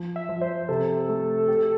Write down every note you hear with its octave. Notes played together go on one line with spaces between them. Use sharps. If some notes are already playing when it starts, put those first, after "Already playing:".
Already playing: F3
E5
F3
C5
C3 A4
A3
G4